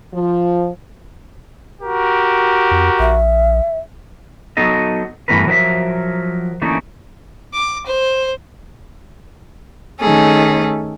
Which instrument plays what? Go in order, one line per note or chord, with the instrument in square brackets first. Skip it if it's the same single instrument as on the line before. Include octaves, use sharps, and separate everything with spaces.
[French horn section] F3
[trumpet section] F#4 G4 A#4
[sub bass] F2
[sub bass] A#1 [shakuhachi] E5
[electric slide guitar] F#3 B3 D#4 A4 D#5
G2 E3 A3 B3 A#4 B4
F3 F#3 A#4 D5 E5
D3 E3 A3 A#3 C#4 D#4
[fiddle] D6
C5
[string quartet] D#3 A3 C#4 G#4 A4